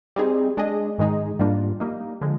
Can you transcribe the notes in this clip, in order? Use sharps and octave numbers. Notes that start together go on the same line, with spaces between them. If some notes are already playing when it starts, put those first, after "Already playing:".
G3 C4 D#4 G#4
G#3 D4 G#4 D#5
G#2 D#3 G#3 D#4 G#4
G#2 G3 A#3 D4 F4
G3 A#3 D#4
D3 F3 G#3